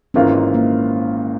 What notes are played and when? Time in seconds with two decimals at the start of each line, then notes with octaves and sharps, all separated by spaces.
0.14 G#1 G#2 E3 A#3 C#4 F4
0.54 A#3